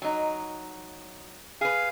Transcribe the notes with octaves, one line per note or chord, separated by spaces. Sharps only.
F#3 D#4
G#4 B4 F5